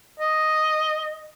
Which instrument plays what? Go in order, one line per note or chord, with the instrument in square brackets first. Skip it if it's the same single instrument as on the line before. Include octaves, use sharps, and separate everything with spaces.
[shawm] D#5